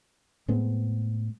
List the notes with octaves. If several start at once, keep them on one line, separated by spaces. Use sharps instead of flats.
A2 G#3 B3 C4